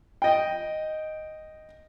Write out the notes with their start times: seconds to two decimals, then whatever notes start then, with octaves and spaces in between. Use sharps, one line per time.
0.22 D#5 G5